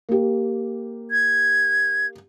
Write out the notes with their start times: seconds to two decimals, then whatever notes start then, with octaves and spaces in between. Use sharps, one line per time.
0.09 A#3 G4
1.11 G#6